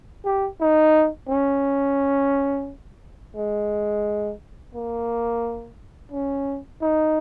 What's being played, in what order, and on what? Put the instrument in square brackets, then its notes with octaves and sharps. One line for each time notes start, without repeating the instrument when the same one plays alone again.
[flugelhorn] G4
D#4
C#4
G#3
A#3
C#4
D#4